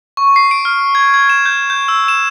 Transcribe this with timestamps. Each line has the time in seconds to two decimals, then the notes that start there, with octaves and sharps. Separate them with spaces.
0.17 C#6
0.36 C7
0.51 D7
0.65 F6
0.95 G#6
1.14 G#6
1.30 E7
1.46 G6
1.70 G6
1.88 E6
2.08 E7